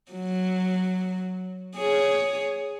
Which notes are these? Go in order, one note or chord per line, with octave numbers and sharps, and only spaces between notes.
F#3
G#4 C#5